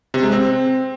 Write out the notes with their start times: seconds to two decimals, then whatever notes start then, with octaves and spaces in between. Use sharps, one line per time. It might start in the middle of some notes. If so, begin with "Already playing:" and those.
0.14 C3
0.23 G#3
0.32 C4